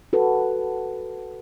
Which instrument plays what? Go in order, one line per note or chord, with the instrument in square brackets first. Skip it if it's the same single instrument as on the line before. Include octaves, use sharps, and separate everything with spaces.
[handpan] F#4 A4 B4